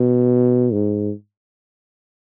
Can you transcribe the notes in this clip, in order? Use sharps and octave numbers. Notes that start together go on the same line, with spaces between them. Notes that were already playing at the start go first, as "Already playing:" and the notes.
Already playing: B2
G#2